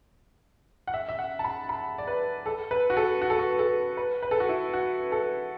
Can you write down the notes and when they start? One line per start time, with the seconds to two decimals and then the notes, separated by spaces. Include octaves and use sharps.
0.87 F#5
0.94 E5
1.09 E5
1.19 F#5
1.39 A5
1.44 B5
1.69 B5
1.98 D5
2.07 B4
2.46 A4
2.71 B4
2.90 F#4
2.97 A4
3.21 F#4
3.30 A4
3.39 F#4
3.59 A4
3.97 B4
4.22 B4
4.31 A4
4.40 F#4
4.49 E4
4.73 F#4
5.12 A4